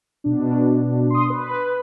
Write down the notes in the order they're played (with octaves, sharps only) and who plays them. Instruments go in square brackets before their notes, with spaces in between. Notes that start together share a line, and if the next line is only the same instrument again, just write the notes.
[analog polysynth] B2 D4
C6 D#6
B4